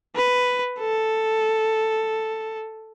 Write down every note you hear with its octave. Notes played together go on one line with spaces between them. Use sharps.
B4
A4